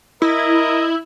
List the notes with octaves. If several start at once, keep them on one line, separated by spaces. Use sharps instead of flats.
E4 A#4 D#5